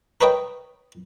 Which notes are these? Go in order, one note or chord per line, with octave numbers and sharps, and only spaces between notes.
A#4 B4 C#5 D#5 G5